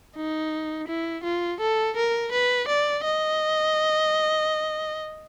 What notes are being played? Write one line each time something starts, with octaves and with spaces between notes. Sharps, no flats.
D#4
E4
F4
A4
A#4
B4
D5
D#5